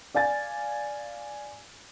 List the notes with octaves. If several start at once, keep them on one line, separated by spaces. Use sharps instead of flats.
D5 F5 G#5 A6